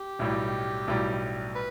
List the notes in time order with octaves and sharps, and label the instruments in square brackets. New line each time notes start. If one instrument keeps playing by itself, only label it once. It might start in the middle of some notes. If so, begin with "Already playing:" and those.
Already playing: [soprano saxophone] G4
[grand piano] B1 A2 G3
B1 A2 G3
[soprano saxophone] B4